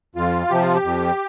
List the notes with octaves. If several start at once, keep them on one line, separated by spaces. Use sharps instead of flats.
F2 F4
C3 F3 G4
F4
G4
F2